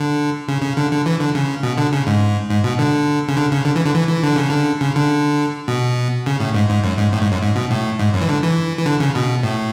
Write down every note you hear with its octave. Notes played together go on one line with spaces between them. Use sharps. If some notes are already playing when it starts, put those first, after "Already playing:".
Already playing: D3
C#3
C#3
D3
D3
E3
D3
C#3
B2
D3
C#3
G#2
G#2
B2
D3
C#3
D3
C#3
D3
E3
D3
E3
E3
D3
C#3
D3
C#3
D3
B2
C#3
A2
G#2
G#2
F#2
G#2
A2
G#2
F#2
G#2
B2
A2
G#2
F#2
E3
D3
E3
E3
D3
C#3
B2
A2